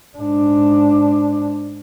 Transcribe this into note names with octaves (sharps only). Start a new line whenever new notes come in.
G#2 D4